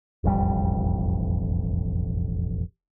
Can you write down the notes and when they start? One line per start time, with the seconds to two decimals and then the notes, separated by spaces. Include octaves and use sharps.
0.24 E1 A1 F2 G3